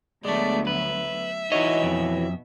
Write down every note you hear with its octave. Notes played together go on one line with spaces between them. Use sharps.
D2 F#3 G#3 A3 B3 D5
B4 E5
E3 D#4 F#4 C#5 D#5
F2 B2